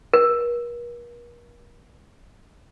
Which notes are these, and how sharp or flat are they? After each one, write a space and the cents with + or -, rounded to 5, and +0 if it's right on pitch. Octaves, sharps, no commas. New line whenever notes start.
A#4 +45